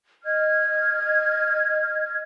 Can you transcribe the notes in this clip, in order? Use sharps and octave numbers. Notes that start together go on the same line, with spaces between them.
D#5 F6 G#6